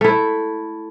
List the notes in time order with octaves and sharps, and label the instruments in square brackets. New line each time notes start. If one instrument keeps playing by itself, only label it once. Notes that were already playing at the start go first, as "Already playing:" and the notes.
[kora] A3 E4